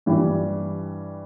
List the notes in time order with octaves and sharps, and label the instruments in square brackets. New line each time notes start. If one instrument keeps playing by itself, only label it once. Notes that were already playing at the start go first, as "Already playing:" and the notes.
[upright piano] G2 E3 G3